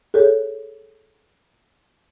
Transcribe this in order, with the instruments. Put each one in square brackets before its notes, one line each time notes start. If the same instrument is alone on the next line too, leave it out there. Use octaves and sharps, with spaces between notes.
[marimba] G#4 A4 C#5